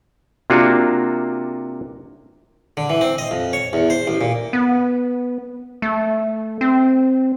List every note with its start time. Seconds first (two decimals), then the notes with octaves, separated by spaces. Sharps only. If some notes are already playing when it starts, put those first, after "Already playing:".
0.50 C3 A#3 D4 F4 F#4
2.77 D3
2.90 E3
3.01 C4
3.18 D#5
3.31 F2
3.53 C#5
3.73 E2
3.90 C5
4.07 A1
4.21 A#2
4.53 B3
5.82 A3
6.61 C4